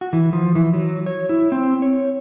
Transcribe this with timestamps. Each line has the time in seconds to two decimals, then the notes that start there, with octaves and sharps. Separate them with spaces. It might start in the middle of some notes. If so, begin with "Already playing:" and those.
0.01 F#4
0.13 E3
0.33 F3
0.55 E3
0.73 F#3
1.06 C#5
1.29 E4
1.52 C4
1.82 C#5